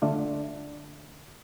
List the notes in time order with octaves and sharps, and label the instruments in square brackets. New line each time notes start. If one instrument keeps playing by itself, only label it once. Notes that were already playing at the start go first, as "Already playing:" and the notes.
[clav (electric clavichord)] D3 A3 D4 F4